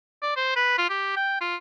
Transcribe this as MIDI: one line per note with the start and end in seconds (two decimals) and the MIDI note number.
0.22 0.34 74
0.36 0.54 72
0.56 0.77 71
0.78 0.88 65
0.90 1.11 67
1.16 1.36 79
1.41 1.56 65